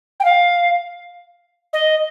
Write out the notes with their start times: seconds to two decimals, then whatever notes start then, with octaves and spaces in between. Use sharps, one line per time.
0.20 G5
0.25 F5
1.73 D#5